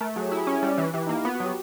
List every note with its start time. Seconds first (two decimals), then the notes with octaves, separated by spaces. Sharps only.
0.01 A3 A#4
0.16 F#3 G#4
0.26 G4
0.32 E4
0.37 G#4
0.47 C#4
0.63 G3
0.78 E3
0.94 E3 G4
1.07 A#3 D#4
1.16 E4
1.25 B3 F4
1.35 F#4
1.40 F#3
1.45 G4